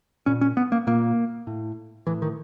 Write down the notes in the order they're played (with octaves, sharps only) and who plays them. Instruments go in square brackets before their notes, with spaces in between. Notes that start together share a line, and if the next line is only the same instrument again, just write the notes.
[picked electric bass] A#2 C#4
C#4
B3
A#3
A#2 A#3
A2
A2 E3
D#3